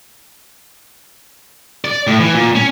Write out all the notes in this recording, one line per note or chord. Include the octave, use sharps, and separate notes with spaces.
D5
A2
E3
A#2
C#4